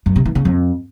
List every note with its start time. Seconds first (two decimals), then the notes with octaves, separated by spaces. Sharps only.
0.06 F#2
0.16 C3
0.26 E3
0.35 C#3
0.45 F2